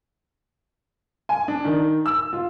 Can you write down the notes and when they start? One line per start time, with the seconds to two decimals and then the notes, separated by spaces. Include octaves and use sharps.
1.29 G#5
1.48 D4
1.65 D#3
2.06 E6
2.33 F4